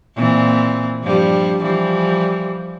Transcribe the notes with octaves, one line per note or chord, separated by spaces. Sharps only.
A#2 E3 C4
G2 F3 G3
E3 F3 G3